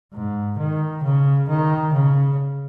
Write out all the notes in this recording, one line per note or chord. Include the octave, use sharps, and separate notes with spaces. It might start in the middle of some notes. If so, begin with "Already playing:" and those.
G#2
D#3
C#3
D#3
C#3